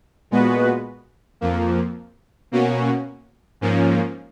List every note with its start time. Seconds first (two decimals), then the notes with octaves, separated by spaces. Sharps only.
0.31 A#2 G#3 B3 F#4 B4
1.41 F2 F3 A#3
2.51 B2 A#3 C#4 F#4
3.61 G#2 F3 A#3 C#4